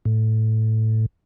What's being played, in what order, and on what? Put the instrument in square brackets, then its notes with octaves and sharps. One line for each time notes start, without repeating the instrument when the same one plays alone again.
[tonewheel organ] A2